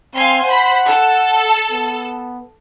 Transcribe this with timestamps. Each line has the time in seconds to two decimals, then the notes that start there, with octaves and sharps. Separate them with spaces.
0.15 C4 F5 G#5 C6
0.44 C5 F#5 B5
0.87 A4
1.72 B3